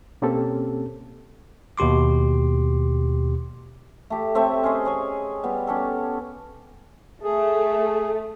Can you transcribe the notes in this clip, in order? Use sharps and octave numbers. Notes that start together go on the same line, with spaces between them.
B2 A#3 C4 C#4 G4 A4
D#2 B2 G4 C6 D6
A3 G4
A3 C4 C#5 E5
C#4 G#4 C5 D#5
G#4 C#5 G#5
G3 B3
C#4 G4 A4
A3 G#4